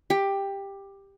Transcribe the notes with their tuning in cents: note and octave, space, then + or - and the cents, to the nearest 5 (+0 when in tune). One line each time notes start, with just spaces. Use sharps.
G4 +10